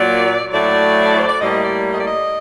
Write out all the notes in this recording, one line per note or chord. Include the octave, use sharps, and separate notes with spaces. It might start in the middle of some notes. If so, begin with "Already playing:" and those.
Already playing: A#2 F#3 A#3 D5
A2 F#3 A3 D5
C5
D5
A2 G3 A#3 D#5
D5
D#5
D5
D#5